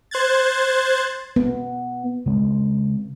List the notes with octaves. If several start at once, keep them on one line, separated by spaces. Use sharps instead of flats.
C5 F#6 G#6 A6
B3
C#3 G#3 C4